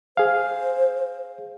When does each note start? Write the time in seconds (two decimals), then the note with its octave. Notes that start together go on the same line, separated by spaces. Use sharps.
0.17 G#4 C5 F5